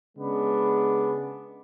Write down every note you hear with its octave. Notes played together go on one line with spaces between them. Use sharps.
C#3 G#3 B3 D4